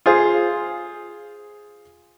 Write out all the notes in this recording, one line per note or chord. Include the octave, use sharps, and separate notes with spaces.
F4 G#4 C5